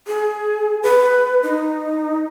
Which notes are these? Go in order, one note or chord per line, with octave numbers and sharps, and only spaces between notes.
G#4
B4
D#4